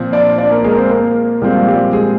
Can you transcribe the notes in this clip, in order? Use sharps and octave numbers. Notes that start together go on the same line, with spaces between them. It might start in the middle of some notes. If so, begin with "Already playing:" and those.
Already playing: A#2 F3 C4
D4 D5
D4 D5
A#3 A#4
G#3 G#4
A#4
C4 C5
A#3 A#4
A#2 F3 G3 G#3 C4 G4
G3 G4
G#3 G#4